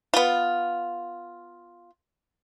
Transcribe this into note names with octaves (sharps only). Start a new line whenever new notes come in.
B3 F4